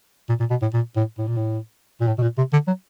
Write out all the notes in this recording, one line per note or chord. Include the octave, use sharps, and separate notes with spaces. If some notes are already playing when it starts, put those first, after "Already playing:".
A#2
A#2
B2
A2
A#2
A2
A2
A#2
A2
A#2
A2
B2
A#2
C3
D3
F#3